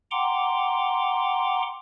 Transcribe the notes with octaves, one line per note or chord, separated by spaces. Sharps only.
F#5 G5 A#5 C6 D6